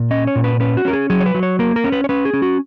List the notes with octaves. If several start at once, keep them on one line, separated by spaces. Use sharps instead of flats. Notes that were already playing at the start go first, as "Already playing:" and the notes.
Already playing: A#2
C#4 D#5
C#5
A#2
B4
C#4 B4
F#4
C#4 A#4
G#4
F#3 G#4
C#5
B4
F#3
C#5
A#3 A#4
A#4
C#4
B4
C#5
C#4 B4
G#4
C#4
F#4